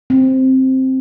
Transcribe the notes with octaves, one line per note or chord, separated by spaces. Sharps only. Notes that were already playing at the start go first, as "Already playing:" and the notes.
C4